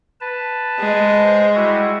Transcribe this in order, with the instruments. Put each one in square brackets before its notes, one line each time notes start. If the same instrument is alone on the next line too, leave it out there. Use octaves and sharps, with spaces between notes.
[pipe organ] B4 A5
[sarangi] G#3
[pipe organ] C5
G3 E4 F#4